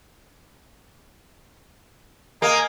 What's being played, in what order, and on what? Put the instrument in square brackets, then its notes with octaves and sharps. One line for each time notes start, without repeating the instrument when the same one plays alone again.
[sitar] A#3 [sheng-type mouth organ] D#5 G#5 A#5